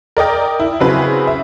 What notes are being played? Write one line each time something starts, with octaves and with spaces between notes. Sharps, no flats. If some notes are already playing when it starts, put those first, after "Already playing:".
A#4 D5 D#5 G5
E4
C#3 F#3 C4 E4 G#4 B4
E5